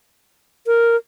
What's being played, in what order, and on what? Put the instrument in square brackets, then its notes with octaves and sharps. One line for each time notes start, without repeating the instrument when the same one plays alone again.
[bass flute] A#4